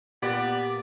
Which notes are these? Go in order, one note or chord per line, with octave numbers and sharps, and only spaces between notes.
A#2 B3 G4 D5